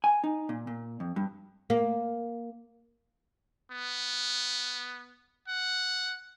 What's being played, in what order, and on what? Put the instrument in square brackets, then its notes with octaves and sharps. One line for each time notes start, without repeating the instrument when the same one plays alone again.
[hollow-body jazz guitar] G#5
D#4
A#2
A#2
F2
G2
[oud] A#3
[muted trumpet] B3
F#5